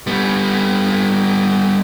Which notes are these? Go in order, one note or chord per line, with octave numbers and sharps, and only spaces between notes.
G3 B3